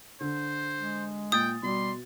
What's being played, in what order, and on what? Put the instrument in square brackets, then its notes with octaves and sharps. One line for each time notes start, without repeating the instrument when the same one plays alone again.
[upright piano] D3 [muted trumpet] C5
[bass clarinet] G#3
[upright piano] A#2 A6 [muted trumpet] G5 [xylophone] D#6
[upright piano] B2 [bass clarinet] G3 [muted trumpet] C6